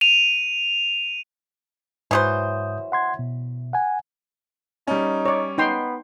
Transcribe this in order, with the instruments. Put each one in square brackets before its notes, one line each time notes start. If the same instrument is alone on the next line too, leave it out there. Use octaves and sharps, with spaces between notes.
[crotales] D#7 F7
[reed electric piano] G#2 D#6 G6 [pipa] E3 F#3 C5
[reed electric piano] F#5 C6 G#6
B2
F#5 G#5
[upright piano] G3 C#4 [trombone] D#4
[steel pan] C#5 D5
[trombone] B3 [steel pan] D#4 G5 C6